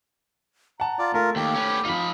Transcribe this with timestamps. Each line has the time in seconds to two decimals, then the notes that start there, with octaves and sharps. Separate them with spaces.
0.80 F#5 A5 A#5
0.99 F4 D5
1.14 A3 F4 A#4
1.36 D#2 G4 G5 D6
1.56 B3 C#4
1.85 F3 D#4 F4 B5